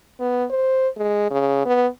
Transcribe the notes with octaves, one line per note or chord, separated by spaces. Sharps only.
B3
C5
G#3
C#3
B3